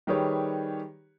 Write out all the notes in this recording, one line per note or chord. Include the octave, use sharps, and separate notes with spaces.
D#3 G3 G4 G#4 B4 C#5